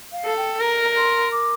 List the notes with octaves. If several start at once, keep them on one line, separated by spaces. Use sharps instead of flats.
F5
A4
G5
A#4 A#5
C6
D6